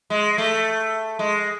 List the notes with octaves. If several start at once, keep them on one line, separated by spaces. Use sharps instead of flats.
G#3
A3
G#3